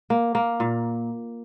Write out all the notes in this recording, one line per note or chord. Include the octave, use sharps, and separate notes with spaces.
A#3
A#3
A#2